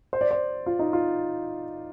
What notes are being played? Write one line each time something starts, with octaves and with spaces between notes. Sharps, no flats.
C5
D5
C5
F4
D#4
F4